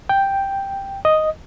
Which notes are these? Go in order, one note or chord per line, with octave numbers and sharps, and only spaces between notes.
G5
D#5